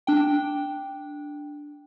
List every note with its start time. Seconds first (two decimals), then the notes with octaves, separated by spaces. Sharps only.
0.07 D4 G5